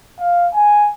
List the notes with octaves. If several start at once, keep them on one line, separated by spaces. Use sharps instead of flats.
F5
G#5